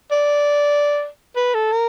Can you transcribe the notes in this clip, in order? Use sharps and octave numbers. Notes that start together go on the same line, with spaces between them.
D5
B4
A4
A#4